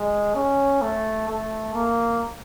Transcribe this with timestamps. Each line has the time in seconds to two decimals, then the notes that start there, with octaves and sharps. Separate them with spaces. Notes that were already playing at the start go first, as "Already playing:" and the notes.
Already playing: G#3
0.35 C#4
0.81 A3
1.28 A3
1.74 A#3